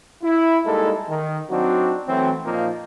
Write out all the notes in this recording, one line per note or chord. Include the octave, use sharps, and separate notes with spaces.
E4
G3 G#3 A#3 D#4 E4 A4
D#3
F#3 C4 D4 D#4 F#4
E3 F#3 A3 C4
A#2 F3 A#3 D#4